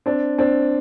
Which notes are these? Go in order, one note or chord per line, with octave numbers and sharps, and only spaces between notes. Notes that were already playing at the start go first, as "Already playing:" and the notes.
C4 D4
C4 D4